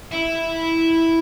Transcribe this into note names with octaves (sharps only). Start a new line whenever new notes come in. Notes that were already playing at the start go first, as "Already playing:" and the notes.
E4